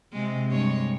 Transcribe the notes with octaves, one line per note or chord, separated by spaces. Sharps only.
C3 G#3
G2 G#3 C#5